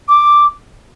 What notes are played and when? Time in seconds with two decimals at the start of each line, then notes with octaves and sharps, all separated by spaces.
0.08 D6